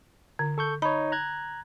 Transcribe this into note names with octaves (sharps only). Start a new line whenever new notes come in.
D3
A4 C#6 G6
D#4 C#5 B5
A#5 F#6 G#6